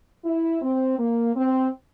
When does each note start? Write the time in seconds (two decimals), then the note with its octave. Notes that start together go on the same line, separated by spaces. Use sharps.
0.25 E4
0.62 C4
0.99 A#3
1.35 C4